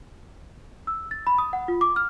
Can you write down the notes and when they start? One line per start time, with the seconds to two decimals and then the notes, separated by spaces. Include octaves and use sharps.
0.87 E6
1.11 A6
1.27 B5
1.38 D#6
1.53 F#5
1.68 F4
1.81 D6
1.96 F6